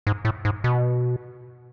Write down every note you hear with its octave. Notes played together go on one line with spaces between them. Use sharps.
G#2
A2
G#2
B2